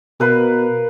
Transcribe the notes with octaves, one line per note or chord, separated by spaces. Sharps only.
B2 A#4 B4 F5